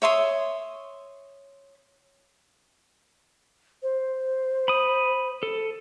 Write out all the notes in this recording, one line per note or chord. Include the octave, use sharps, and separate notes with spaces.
C#5 E5 C6 D#6
C5
B5 D#6
A4